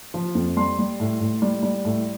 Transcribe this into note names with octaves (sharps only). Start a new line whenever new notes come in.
F3
F2
G3 C6
G3
A2
A2
G3
G3
A2